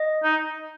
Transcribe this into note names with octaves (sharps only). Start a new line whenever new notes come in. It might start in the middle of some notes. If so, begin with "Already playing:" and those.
Already playing: D#5
D#4